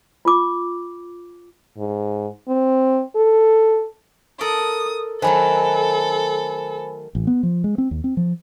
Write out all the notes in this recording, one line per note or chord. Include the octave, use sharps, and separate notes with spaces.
F4 D6
G#2
C4
A4
A4 A#4 D5 D#6
D#3 F#3 A3 A4 C5 G#5 B5
A1
B3
F3
G#3
C4
D#2
C4
F3